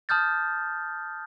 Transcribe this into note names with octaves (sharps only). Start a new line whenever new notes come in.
A5 D#6 F6 G6 A6